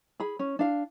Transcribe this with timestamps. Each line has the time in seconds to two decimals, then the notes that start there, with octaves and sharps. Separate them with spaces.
0.20 G#4 B5
0.39 C#4
0.59 D4 F5